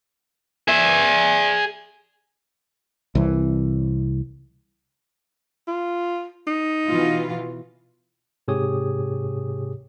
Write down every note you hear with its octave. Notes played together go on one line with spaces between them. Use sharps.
G#4 E5
C2 E3
F4
D#4
B2 E3 F4
G#2 C3 G4 G#4 C#5 D#6